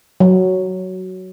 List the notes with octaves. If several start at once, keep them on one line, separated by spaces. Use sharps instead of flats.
F#3